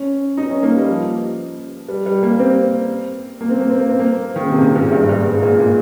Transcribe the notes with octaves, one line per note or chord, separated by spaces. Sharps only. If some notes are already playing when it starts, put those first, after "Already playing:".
Already playing: C#4
D#4
C#4
A#3
G3
F3
G3
G3
A#3
C4
A#3
C4
A#3
C4
A#3
C4
A#3
D#3
C#3
C3
A#2
G#2
G2
G2
G#2
G#2
A#2
A#2